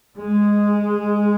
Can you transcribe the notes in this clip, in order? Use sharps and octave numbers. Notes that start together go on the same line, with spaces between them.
G#3